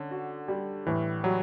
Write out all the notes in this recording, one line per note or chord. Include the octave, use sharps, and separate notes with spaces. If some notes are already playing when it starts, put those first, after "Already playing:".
Already playing: D3 C#4
F#4
G3
A2 E3
F#3 G3